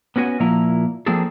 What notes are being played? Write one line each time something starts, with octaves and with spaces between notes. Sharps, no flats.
B3 C#4 F#4 B4 G#5
A#2 F3 A#3 E4 A#5
F3 A#3 C4 D4 G#4 A4